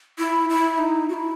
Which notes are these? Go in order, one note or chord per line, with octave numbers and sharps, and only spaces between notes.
E4
E4
D#4
F#4
E4